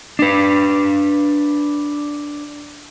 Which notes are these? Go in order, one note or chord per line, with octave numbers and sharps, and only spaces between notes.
D4 B4